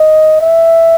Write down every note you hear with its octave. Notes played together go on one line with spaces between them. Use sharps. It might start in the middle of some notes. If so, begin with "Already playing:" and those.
Already playing: D#5
E5